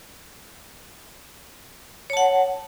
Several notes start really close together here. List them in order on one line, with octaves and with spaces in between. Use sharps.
C#5 A5 F#5